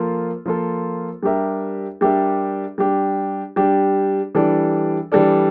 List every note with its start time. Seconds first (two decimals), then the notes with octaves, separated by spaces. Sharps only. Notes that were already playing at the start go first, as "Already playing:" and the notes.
Already playing: F3 A#3 F4 A4
0.46 F3 A#3 F4 A4
1.23 G3 D4 G4 A#4 E5
2.01 G3 D4 G4 A#4 E5
2.78 G3 D4 G4
3.56 G3 D4 G4
4.35 E3 G3 D4 A4 D5
5.12 E3 G3 D4 A4 D5